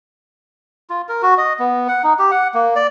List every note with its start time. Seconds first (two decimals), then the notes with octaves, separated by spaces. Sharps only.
0.90 F4
1.09 A#4
1.22 F#4
1.38 D#5
1.60 B3
1.88 F#5
2.04 D#4
2.19 G4
2.31 F#5
2.54 A#3
2.76 D5